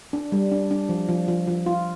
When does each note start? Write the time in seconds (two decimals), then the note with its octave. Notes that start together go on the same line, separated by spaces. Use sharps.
0.13 D4
0.32 G3
0.52 D4
0.71 D4
0.89 F3
1.09 F3
1.28 F3
1.47 F3
1.66 F4